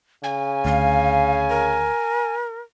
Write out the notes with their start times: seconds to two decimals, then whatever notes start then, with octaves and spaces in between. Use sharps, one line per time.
0.24 C#3 G#5
0.65 D2 F5
1.49 A#4